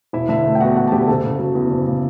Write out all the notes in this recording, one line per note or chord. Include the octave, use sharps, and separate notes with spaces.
E1 E4 E5
D3 E4 E5
A3
G5
E2 F#4 F#5
E1 F#4 F#5
A5
D3 G4 G5
F#1 A4 A5
C#3
F#3
E2
F#1
C#3